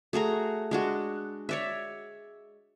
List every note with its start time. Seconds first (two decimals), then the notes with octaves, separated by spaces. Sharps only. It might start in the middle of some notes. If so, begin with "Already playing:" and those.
0.13 A3 F#4 G#4 A#5
0.71 G#3 D4 F#4
1.49 C#5 D5 E5